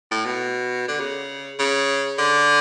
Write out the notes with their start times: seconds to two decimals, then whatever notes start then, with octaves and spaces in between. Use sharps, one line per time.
0.11 A2
0.26 B2
0.88 D3
1.00 C#3
1.59 C#3
2.18 D3